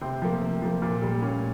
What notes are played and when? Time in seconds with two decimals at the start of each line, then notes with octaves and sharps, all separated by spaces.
0.01 C3 C4
0.22 F3 A#3
0.42 C3
0.62 F3 A#3
0.82 A#2
1.02 G3 A#3
1.22 A#2 C#4